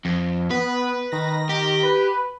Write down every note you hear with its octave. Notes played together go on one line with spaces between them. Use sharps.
F2
B3 B4
D#3 A#6
G4
B4